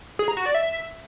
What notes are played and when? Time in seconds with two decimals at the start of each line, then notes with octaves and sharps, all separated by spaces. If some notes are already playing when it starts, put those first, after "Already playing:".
0.19 G#4
0.28 A#5
0.37 F#4
0.46 D5
0.54 E5